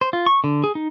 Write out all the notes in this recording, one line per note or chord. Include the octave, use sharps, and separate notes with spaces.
C5
F4
C#6
D3
G#4
D#4